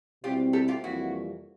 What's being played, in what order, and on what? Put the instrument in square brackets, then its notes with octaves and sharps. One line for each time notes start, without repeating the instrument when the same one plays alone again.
[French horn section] B2 G3 C4 E4 [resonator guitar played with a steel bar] F4 G4
[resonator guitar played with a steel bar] G4 A4
F4 G4
[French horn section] F2 C3 E3 G3 A#3 [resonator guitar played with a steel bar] E4 F#4